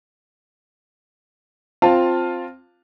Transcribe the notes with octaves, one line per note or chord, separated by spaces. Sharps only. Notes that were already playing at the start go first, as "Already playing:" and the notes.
C4 F4 F5 A5